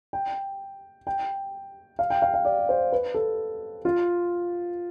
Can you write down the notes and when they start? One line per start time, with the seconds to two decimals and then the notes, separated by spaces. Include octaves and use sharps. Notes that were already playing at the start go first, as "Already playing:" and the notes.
0.13 G5
1.07 G5
1.99 F5
2.10 G5
2.22 F5
2.34 F5
2.45 D5
2.69 C5
2.92 B4
3.14 A4
3.85 F4